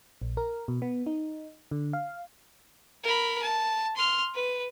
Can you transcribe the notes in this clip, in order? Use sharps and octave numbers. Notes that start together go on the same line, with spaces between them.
A#1
A#4
B2
B3
D#4
D3
F5
A#4 B5
A5
C6 F6
B4